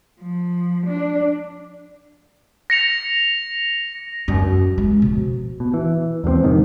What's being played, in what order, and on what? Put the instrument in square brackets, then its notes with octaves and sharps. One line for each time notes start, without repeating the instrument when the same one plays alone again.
[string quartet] F3
D4
[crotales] A#6 C#7 F7
[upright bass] F#2
G#3
B2 F3
[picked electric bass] B2
E3
E2 B2 A#3 C4
F2 G#2 C3 D#3